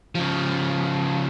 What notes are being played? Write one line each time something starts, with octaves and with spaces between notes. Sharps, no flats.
C#3 F3